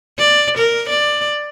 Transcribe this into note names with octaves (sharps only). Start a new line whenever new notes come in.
D5
A#4
D5